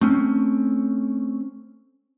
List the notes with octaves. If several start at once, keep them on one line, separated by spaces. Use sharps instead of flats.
A3 C4 C#4